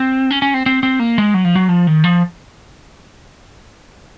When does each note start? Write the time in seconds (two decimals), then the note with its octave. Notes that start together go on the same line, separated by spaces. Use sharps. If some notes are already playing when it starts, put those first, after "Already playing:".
Already playing: C4
0.31 C#4
0.42 C#4
0.54 C4
0.66 C4
0.83 C4
1.00 A#3
1.18 G#3
1.34 F#3
1.45 F3
1.55 F#3
1.69 F3
1.87 D#3
2.04 F3